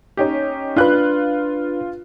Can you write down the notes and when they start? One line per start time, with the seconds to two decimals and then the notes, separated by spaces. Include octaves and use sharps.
0.17 C#4 D#4 G4
0.76 D4 F4 B4 F#6